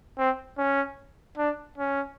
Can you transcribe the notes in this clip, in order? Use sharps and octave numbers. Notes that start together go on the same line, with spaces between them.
C4
C#4
D4
C#4